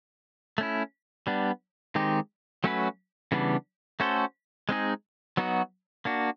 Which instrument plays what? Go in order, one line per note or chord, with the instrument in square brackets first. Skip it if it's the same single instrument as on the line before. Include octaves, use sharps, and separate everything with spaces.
[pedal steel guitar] A3 C#4 E4
G3 B3 D4
D#3 G#3 C4 D#4 G4
F#3 A3 C#4 F#4 B4
C#3 E3 G3 B3 D4
A3 C#4 F#4 A4 C5
G#3 C4 D#4 G#4
F#3 B3 D#4 F#4
A#3 D4 F#4